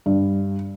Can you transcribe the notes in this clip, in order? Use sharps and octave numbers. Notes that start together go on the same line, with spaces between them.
G2